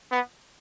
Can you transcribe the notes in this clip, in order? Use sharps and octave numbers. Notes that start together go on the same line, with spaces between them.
B3